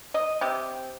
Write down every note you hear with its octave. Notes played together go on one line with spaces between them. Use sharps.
D#5
C3 G4